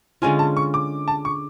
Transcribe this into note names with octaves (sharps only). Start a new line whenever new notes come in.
D3 G#3 C#4 F4 G#5
A5
C#6
D6
A5
C#6